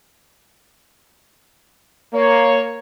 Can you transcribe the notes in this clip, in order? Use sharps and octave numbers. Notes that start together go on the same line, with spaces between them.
A#3 C#5